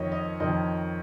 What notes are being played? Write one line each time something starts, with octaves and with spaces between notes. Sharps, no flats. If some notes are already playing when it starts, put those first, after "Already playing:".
Already playing: F2 D#3 C#5 D#5
D#5
F2 D#3 D#5